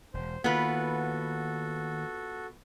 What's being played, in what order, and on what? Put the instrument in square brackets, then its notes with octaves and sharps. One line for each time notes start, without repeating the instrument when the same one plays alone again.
[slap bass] E1 [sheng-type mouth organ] C5
[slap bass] D#3 A#3 [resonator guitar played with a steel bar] B3 F4 B4 [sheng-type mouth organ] F#4 A4